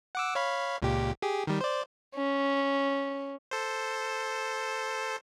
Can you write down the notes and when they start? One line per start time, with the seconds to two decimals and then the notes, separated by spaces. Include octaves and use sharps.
0.15 F#5 D6 E6
0.35 C#5 F5 B5
0.82 C#2 A#2 G4
1.22 G4 G#4
1.47 D#3 G3
1.61 C5 D5
2.15 C#4
3.51 A4 C5